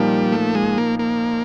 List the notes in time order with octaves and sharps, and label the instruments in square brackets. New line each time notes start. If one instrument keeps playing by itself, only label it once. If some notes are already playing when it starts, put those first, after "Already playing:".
Already playing: [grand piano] A#2 F3 A#3 D#4 [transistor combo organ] G3
[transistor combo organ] A3
G#3
A#3
A#3